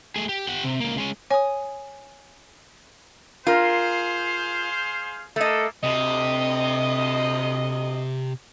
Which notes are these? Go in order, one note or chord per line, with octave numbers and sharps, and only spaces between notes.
A3 G#4
G4
G4 F#5
C3
C#2 A#3
G#3 C#4
C#5 G#5 D#6
F4 G#4 A#4 C5 F5
A3 A#3 A4 D#5
D2 C3 D#5